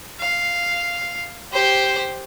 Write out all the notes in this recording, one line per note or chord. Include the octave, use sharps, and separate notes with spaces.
F5
G4 C5